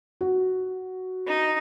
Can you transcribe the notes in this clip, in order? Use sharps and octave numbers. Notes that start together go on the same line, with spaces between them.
F#4
D#4